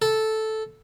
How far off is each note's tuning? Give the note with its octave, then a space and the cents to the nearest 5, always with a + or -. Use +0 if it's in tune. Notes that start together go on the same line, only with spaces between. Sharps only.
A4 -5